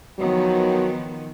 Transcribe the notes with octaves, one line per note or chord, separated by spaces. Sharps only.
D#3 F3 F#3 B3